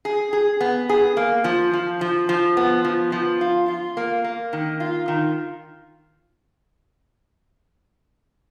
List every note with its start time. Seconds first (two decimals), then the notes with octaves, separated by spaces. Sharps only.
0.05 G#4
0.33 G#4
0.61 B3
0.89 G#4
1.17 A#3
1.44 F3
1.73 F3
2.01 F3
2.29 F3
2.57 B3
2.85 F3
3.12 F3
3.41 F4
3.68 F4
3.97 A#3
4.24 A#3
4.53 D#3
4.80 F4
5.08 D#3